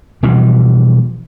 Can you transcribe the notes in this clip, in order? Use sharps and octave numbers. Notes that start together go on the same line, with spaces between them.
B2 E3 F3 G3